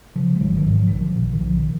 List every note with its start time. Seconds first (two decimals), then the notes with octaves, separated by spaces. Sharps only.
0.16 C#3 F3
0.36 G#3
0.40 G#1 D#3 F#3
0.57 D#3 F#3
0.66 G#2
0.74 F3
0.87 A#1 D#3
1.01 F3
1.15 A#2
1.33 D#3
1.40 B1 F3
1.57 D#3